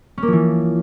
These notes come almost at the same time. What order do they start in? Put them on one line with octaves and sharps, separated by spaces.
C#4 A#3 F3 E3